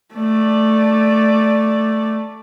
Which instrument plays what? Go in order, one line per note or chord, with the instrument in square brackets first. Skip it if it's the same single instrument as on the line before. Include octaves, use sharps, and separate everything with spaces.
[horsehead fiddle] A3 D5